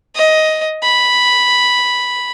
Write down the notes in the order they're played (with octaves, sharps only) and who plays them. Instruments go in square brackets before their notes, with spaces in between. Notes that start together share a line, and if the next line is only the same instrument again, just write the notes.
[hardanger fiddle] D#5
B5